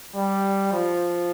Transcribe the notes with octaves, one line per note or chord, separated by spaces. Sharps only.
G3
F3